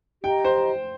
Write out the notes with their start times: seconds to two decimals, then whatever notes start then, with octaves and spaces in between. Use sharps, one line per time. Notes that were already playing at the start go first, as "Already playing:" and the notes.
0.24 G4 D#5 G5 A#5
0.45 C5